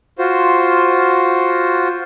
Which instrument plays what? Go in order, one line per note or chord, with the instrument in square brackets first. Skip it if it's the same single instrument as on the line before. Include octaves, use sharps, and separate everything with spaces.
[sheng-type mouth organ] F4 F#4 C5